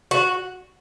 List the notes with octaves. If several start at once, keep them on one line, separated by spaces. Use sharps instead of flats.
F#4